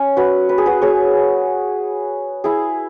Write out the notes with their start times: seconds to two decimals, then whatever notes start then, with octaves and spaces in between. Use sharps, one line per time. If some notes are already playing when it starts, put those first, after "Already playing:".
Already playing: C#4
0.17 F#4 B4
0.49 B4
0.58 G#4
0.66 F#4 B4
0.82 G#4 C#5
2.44 E4 G#4